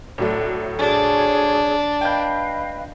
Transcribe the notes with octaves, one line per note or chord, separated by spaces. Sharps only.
A2 F#3 A3 D4
D4 G#4 C#5
B4 D#5 F5 G5 G6